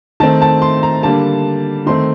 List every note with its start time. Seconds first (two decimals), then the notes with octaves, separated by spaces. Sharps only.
0.20 D#3 A3 C4 A5
0.42 A5
0.62 C6
0.83 A#5
1.03 D3 G3 A#3 A5
1.86 D#3 A3 C4 C6